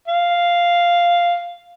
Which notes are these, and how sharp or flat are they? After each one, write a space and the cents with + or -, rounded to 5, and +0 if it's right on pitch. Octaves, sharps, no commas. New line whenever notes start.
F5 -5